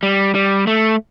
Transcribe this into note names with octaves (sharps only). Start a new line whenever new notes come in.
G3
G3
A3